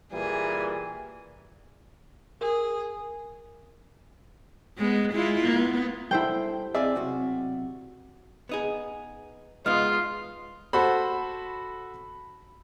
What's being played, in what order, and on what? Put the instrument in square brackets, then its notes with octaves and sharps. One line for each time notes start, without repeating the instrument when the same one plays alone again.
[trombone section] A#2 E3 G3 [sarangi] G#4
[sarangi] G#4 [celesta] A#4
[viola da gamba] G#3 B3
G#3 E4 F4
B3
[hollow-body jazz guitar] G3 A4 [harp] E4 C5 G5
[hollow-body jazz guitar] C4 G#4 [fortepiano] D5 E5 F5
[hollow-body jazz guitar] B1 C3 F#4
B3 D#4 G#4
[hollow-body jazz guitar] G#3 B3 D#4 [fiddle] F4 [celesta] D#6 F6
[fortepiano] F#4 A4 C5 [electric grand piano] B5